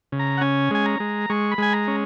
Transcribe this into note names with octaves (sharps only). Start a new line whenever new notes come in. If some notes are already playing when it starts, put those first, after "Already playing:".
C#3
A#5
F#5
C#4 G#5
G#3 G#5
A#5
G#3
G#3 C#6
B5
G#3 G#5
A#5
C#4